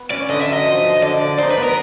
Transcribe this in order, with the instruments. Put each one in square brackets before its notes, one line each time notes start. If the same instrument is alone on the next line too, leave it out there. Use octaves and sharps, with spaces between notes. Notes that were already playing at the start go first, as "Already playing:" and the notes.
Already playing: [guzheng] B3
[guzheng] C#4 [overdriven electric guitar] D5
[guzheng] D3 [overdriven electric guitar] D#5
[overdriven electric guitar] E5
[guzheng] F#3
[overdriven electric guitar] D#5
[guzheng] F3
F3
[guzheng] D3 [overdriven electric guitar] D5
[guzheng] D3
[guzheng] D#4 [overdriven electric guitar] C5
[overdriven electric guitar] B4
[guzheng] B3
[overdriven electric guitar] A#4